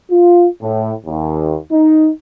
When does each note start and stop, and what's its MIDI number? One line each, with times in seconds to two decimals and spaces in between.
0.10 0.46 65
0.61 0.92 45
1.06 1.57 39
1.70 2.09 63